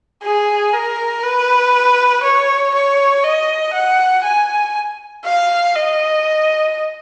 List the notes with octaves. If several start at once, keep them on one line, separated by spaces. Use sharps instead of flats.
G#4
A#4
B4
C#5
C#5
D#5
F#5
G#5
F5
D#5